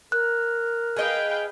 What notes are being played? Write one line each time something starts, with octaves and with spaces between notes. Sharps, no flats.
A#4 F#6
G#4 B4 D#5 F5 G5